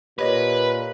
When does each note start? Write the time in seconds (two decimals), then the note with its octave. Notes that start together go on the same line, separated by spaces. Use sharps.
0.19 A#2 G4 B4 C#5 D#5